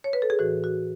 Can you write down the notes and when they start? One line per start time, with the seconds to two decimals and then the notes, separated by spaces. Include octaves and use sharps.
0.04 C#5
0.13 B4
0.22 A4
0.30 G#4
0.39 A2 E3 F#4
0.64 F#4